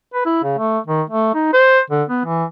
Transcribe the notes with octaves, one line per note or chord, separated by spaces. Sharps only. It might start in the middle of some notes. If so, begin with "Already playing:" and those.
B4
E4
C#3
A3
D#3
A3
D#4
C5
D3
B3
E3